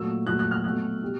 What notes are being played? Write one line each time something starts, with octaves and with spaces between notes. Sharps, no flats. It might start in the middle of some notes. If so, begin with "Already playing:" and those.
Already playing: A#2 F#3 A3 E6
A#2 F#3 A3 F#6
F#6
F6
B2 F#3 A3 F#6
B2 G3